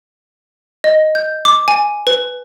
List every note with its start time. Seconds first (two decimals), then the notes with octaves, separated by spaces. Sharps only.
0.84 D#5
1.15 G6
1.45 D6
1.68 G#5
2.07 B4